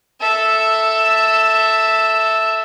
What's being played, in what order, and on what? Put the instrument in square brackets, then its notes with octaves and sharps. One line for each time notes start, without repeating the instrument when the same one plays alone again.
[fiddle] A4 E5